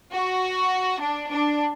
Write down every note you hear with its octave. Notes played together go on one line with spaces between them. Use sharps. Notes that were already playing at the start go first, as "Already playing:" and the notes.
F#4
D4
D4